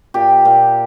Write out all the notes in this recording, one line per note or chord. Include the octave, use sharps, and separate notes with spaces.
A#2 G4
A#2